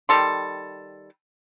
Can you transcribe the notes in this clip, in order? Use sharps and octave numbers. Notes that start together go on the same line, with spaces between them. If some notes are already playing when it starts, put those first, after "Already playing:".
D#3 G3 A4 C6